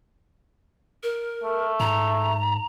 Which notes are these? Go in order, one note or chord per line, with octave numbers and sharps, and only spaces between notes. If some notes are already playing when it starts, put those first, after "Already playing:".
A#4
A3
G#2 A#5